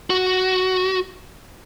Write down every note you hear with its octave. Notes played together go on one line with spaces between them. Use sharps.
F#4